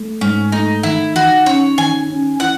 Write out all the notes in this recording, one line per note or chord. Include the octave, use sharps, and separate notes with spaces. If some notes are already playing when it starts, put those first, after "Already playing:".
Already playing: A3
G#2 C#4
A3 D#4
D#3 E4
D#3 F#4
C#4 C#5
D#3 G#5
C#4
E3 F#5